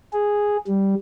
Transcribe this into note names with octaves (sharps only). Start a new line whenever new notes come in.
G#4
G3